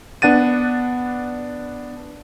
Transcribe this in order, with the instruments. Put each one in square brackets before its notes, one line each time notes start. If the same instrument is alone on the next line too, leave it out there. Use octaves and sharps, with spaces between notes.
[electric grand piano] B3 D4 F#5 A6 D#7